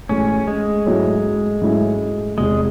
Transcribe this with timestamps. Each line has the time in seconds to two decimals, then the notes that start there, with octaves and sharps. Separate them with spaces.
0.09 A1 A2 G#3 C#4
0.48 G#3
0.86 G#2 F#3 A3 C#4 E4
1.62 G#2 F#3 A3 C#4 E4
2.38 E1 E2 C3 G#3